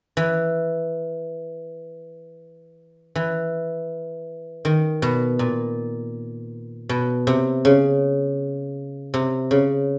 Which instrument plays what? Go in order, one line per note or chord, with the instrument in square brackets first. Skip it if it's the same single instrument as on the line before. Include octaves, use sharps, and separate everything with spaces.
[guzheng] E3
E3
D#3
B2
A#2
B2
C3
C#3
C3
C#3